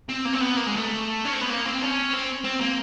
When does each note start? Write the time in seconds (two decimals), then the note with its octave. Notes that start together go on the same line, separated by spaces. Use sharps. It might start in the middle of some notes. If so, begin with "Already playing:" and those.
0.09 C4
0.25 A#3
0.33 C4
0.41 B3
0.57 A#3
0.67 G#3
0.77 A3
1.25 C#4
1.33 C4
1.42 B3
1.50 A#3
1.65 C4
1.82 C#4
2.13 C4
2.44 C4
2.60 A#3